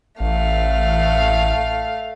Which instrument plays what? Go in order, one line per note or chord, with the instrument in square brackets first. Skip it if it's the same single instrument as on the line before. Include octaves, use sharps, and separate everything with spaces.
[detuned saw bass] A1 [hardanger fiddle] A3 F5